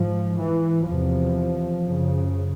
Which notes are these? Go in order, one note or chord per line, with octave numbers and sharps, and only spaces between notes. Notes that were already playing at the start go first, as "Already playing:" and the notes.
Already playing: G#2 F3
E3
E2 C3 F3
F#2 C#3